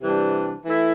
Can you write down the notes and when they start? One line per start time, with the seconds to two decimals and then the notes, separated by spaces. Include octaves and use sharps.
0.02 C3 E3 G3 D4
0.65 E3 A3 E4